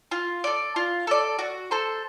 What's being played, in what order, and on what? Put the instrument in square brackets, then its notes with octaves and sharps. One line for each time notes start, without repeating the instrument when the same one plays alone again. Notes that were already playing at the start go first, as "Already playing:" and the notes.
[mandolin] F4
A4 D5
F4
A4 D5
F#4
A4 C5